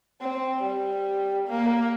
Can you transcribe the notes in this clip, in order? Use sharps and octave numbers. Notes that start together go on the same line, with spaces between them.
C4
G3
A#3